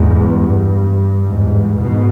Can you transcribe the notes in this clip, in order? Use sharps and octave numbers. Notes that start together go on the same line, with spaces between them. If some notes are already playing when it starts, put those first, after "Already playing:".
Already playing: E2 G#2
G2
E2 G#2
G#2 B2